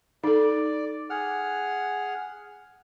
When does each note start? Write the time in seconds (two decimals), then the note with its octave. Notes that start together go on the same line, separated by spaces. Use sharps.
0.24 D#4 A4 D5
1.10 G#4 F#5 F6